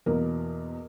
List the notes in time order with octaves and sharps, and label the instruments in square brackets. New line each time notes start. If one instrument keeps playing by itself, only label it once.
[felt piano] E2 B2 A#3 A#4